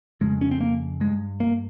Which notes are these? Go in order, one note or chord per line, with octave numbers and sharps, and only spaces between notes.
F2 C#3 G#3
C#4
C4
A#3
G2 G#3
A#3